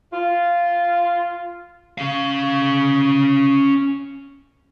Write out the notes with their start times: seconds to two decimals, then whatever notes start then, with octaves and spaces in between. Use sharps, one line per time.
0.13 F4
1.98 C#4 F5